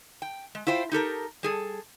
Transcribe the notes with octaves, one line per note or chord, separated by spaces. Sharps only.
G5
G#3
E4 F4 C5 G5
D#4 G4 A4 A#4
G3 G#4 A4